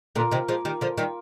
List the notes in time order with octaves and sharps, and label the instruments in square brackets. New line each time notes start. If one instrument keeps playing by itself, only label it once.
[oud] A#2 D3 [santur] A#3 F4 A#4
[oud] C3 D#3
F3 G#3
D#3 G3
D3 F3
D#3 G3